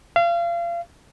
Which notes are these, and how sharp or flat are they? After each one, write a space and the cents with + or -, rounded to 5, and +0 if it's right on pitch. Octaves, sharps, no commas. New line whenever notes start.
F5 -30